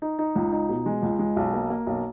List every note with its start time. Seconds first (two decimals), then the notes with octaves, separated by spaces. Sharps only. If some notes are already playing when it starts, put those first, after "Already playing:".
0.02 D#4
0.19 D#4
0.36 C#2
0.52 D#4
0.69 B2
0.86 G#3
1.02 C#2
1.19 G#3
1.36 B1
1.54 A#3
1.70 A#3
1.87 B1